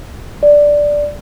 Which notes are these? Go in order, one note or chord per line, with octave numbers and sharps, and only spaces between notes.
D5